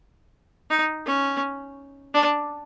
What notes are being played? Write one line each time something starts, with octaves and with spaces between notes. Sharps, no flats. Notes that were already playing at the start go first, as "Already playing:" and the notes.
D#4
C#4
D4